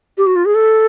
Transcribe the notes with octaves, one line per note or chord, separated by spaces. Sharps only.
G4
F#4
F4
G#4
A4